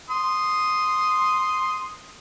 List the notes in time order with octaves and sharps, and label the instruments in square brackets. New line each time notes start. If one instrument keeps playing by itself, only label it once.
[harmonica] C6 D#6